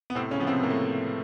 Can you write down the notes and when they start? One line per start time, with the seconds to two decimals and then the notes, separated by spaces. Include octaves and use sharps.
0.10 B3
0.15 A2 C3 C4
0.31 C#3 C#4
0.40 F3 B3
0.47 C3 C4
0.63 A2 A#3
0.70 A3